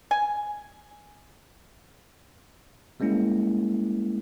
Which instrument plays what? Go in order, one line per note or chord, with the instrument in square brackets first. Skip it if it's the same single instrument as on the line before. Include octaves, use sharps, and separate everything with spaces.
[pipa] G#5
[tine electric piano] G3 G#3 A#3 C#4 E4